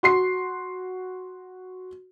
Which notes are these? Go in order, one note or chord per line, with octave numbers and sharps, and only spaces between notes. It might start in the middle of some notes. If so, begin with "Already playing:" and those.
F#4 C6 C7